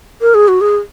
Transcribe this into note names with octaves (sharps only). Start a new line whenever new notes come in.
A#4
G#4
F#4
G#4